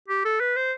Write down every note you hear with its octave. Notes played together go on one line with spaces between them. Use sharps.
G4
A4
B4
C5